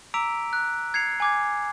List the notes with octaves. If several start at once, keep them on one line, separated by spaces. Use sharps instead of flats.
A#5 D6 E6 B6 D7 F7
F#6
G#6 C7 C#7 F7
G#5 D6 G#6